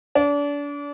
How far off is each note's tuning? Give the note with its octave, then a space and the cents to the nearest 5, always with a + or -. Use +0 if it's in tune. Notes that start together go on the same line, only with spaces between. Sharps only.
D4 -35